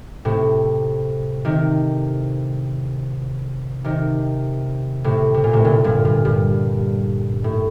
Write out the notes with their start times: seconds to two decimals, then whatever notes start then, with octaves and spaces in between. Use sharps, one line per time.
0.25 A2 C3
1.45 C3 D#3
3.84 C3 D#3
5.04 A2 C3
5.34 C3
5.44 A#2
5.53 A2 C3
5.64 A#2 D3
5.84 G2 A#2
6.05 G2
6.25 G2
7.44 A2